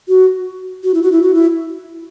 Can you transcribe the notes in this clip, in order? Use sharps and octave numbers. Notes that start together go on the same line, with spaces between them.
F#4
F#4
E4
F#4
E4
F#4
E4